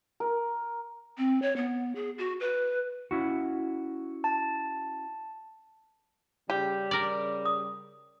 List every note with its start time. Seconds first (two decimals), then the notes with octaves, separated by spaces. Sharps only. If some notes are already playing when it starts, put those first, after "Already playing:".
0.20 A#4
1.18 C4
1.42 C#5
1.56 B3
1.96 G#4
2.18 F#4
2.40 B4
3.11 C#4 E4 F#4
4.24 A5
6.50 C#3 G3 G4
6.91 A#4 D5
7.45 D#6